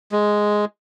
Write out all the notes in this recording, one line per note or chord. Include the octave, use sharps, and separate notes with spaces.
G#3